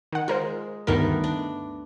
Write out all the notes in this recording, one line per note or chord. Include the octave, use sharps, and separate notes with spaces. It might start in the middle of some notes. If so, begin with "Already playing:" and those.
D#3 F#5
G#3 F4 A#4 C5
D2 G2 D#3 A3 B3 A#4
D4